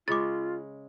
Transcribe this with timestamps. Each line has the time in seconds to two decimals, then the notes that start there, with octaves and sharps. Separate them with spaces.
0.08 C#3 G#3 F4 D6 A6